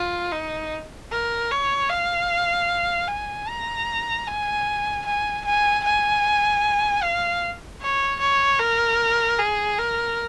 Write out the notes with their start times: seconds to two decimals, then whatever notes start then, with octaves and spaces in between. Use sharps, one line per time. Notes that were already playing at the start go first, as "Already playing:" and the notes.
Already playing: F4
0.32 D#4
1.11 A#4
1.51 C#5
1.90 F5
3.08 G#5
3.48 A#5
4.27 G#5
5.06 G#5
5.45 G#5
5.84 G#5
7.03 F5
7.82 C#5
8.20 C#5
8.60 A#4
9.39 G#4
9.79 A#4